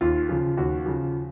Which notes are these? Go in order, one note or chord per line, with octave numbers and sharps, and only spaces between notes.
D#2 F4
C#3 F3
D#2 F#4
C#3 F3